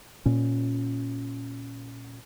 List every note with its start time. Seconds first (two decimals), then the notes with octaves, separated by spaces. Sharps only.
0.26 A#2 C#4